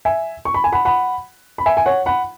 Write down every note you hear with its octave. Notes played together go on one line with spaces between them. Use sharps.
E5 G#5
C#6
B5
G#5
F#5 B5
F#5 B5
B5
E5 G#5
G#5
C#5 F#5
F#5 B5